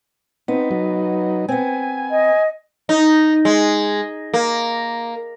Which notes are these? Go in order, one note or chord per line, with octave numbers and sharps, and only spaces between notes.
B3 C4 D#4
F#3 D#4
B3 C4 G#5
D#5
D#4
G#3
A#3